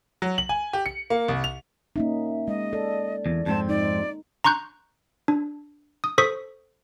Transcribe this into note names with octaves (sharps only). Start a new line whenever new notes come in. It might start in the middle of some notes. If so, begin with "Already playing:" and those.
F#3
F#7
G#5
G4
C#7
A#3
C2
F7
A#3 C#4 D#4 E5
G#3 D#5
A4 D5
E2
F2 G#2 C4 A5
D#4 D5
A#5 C6 C#6 F#6 G6
D4
D#6
A4 C5 C#6 D#6 B6